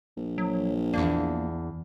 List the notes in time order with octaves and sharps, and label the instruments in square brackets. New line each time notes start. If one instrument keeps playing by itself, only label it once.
[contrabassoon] A#1
[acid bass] F#3
[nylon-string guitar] E2 G2 D4 [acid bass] A#3